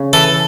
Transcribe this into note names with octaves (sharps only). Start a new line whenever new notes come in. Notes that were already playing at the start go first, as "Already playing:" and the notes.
Already playing: C#3
E3 A4